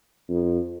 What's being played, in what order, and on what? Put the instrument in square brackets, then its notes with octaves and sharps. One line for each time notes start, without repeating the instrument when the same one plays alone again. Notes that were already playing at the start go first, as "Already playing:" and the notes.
[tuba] F2